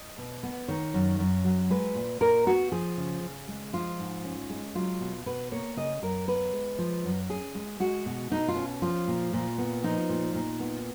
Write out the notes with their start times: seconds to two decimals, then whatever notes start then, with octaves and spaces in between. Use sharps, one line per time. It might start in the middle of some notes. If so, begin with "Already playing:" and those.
Already playing: D#5
0.18 B2
0.43 B3
0.68 D#3 C#5
0.94 F#2
1.19 F#2
1.44 F#3
1.70 G#3 B4
1.95 A#2
2.21 A#2 A#4
2.46 B3 F#4
2.72 F3 G#4
2.97 C#3
3.23 C#3
3.48 G#3
3.73 F3 F4
3.99 G#2
4.25 C#4
4.50 G#3
4.75 F#3 F4
5.01 B2
5.26 B2 B4
5.52 A#3 C#5
5.77 C#3 D#5
6.02 F#2 A#4
6.27 B3 B4
6.53 G#3
6.78 F3
7.04 F#2
7.30 C#4 G#4
7.55 G#3
7.80 G#3 F#4
8.06 B2
8.31 B2 D#4
8.48 F4
8.56 C#4
8.82 F3 F4
9.08 A#2
9.33 A#2
9.58 B3
9.84 F3 D#4
10.09 A#2
10.34 A#2
10.60 B3